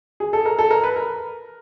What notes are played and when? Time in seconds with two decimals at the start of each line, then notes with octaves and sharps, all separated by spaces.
0.20 G#4
0.33 A4
0.46 A#4
0.59 A4
0.71 A#4
0.84 B4
0.96 A#4